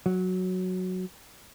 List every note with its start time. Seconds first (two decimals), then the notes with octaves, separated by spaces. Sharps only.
0.06 F#3